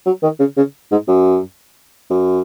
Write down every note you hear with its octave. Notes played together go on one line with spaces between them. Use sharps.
F#3
D#3
C#3
C#3
G#2
F#2
F#2